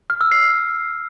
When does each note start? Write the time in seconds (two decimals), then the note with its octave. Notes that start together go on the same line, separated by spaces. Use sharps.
0.10 F6
0.21 E6
0.32 C7